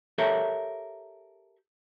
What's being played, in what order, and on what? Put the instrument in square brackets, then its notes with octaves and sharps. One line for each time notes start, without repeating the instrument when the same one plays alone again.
[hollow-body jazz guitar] G4 A4 A#4 C#5 E5